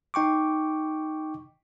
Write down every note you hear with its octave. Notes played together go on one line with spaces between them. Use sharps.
D#4 G5 C#6 D6